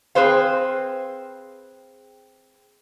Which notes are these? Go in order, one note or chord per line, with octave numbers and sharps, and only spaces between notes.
C4 G#4 B4 C5 F5